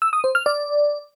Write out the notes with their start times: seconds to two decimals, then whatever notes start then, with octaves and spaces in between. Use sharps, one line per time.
0.02 E6
0.13 D#6
0.24 C5
0.35 F6
0.46 D5